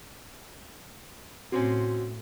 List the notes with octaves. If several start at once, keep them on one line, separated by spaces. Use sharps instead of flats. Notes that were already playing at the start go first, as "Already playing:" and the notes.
A2 C3 C4 C#4 F#4